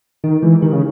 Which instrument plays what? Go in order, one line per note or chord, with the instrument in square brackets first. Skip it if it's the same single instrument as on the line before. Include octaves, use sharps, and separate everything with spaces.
[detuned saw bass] D#3 [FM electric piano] D#4
[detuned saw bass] E3 [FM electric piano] G#3
[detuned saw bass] D#3 [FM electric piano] G4
[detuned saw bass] C#3